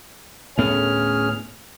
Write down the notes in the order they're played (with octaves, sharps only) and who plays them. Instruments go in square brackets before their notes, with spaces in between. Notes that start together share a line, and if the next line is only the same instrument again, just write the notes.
[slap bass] D2 A2 B3 [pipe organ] C#4 G#4 F6